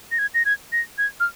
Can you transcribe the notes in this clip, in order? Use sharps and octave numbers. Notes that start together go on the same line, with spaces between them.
A#6
G#6
A#6
G#6
A#6
G#6
F6